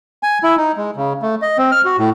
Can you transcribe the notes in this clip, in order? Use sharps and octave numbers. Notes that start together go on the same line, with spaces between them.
G#5
E4
D#4
G#3
C#3
A3
D#5
C4
F6
F#4
A2